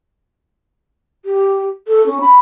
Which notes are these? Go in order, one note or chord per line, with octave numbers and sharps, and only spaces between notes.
G4
A4
C#4
B5